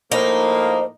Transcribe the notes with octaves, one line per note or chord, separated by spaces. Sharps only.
A2 F3 A#3 D#4 C5